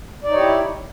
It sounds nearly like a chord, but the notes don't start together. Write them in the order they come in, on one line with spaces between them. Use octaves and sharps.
D5 D#4 C#5 G4 E4